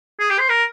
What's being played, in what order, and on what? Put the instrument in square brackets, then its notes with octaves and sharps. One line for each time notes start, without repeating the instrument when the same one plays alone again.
[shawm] G#4
G4
C5
A#4